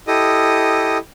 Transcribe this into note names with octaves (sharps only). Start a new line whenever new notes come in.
E4 G4 A4 D#5 D#6